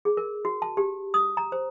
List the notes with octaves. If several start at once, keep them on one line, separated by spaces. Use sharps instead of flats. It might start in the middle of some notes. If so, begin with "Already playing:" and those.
G#4
A#4
F#4
A5
G4
D#6
A#5
C5